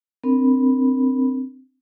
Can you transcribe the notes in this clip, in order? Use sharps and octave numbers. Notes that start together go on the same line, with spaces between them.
C4 D4 A#4 B5